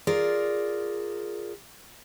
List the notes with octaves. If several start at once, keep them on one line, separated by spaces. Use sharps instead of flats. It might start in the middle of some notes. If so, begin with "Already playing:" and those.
F4 G#4 A#4 D5